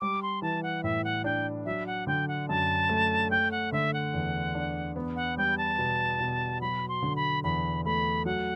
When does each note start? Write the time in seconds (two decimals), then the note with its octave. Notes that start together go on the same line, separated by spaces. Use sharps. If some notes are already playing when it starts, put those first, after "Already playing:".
0.01 G3 D6
0.22 C6
0.42 E3 A5
0.63 F#5
0.84 A2 E5
1.04 F#5
1.24 D4 G5
1.65 F#3 E5
1.87 F#5
2.07 D3 G5
2.28 F#5
2.49 F#2 A5
2.89 A3
3.31 A3 G5
3.51 F#5
3.72 D3 E5
3.94 F#5
4.13 E2
4.55 D4
4.96 B3
5.16 F#5
5.37 G3 G5
5.58 A5
5.78 B2
6.20 B2
6.61 F#3 B5
6.89 C6
7.02 D3
7.16 B5
7.44 E2 B5
7.85 A3 B5
8.25 F#3 F#5